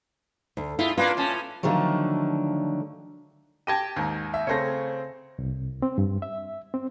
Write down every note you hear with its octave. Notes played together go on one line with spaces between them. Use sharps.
D2
G2 E4 F4 E5
A#3 C4 D4 F4 B4
A2 C#4 A5
D3 D#3 F3 F#3 A3
G4 G5 A5 G#6 A#6 D#7
D#2 G#2
E5
C#3 A3 C4 C#5 A#6
C2
C4
G2
E5
C4